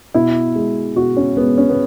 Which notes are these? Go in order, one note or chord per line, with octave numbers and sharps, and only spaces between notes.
B2 E4
G#3
B2 F#4
C#4
G#3 B3
C#4
B3